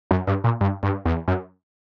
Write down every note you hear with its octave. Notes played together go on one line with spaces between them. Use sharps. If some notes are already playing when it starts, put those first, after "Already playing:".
F#2
G2
A#2
G2
G2
E2
F#2